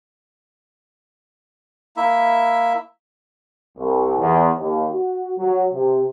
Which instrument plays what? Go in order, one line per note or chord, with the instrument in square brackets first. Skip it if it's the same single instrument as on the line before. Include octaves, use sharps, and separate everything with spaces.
[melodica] A#3 E4 E5
[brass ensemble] C2
E2
D#2
F#4
F#3
C3